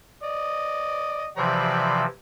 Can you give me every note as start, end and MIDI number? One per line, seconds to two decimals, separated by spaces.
0.23 1.29 74
0.23 1.29 75
1.37 2.06 48
1.37 2.06 52
1.37 2.06 53
1.37 2.01 74
1.37 2.01 79
1.37 2.01 83